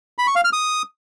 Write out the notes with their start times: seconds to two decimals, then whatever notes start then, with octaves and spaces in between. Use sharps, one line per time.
0.18 B5
0.27 C#6
0.36 F5
0.44 F6
0.53 D#6